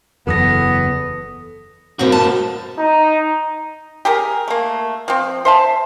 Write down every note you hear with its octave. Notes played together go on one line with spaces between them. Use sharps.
F#1 E2 B3 A4 D#6 A#6
G2 G3 A#3 C4 F#4
A5
D#4
G4 G#4 A#4
A3 A#3
F3 C4
C5 E5 A5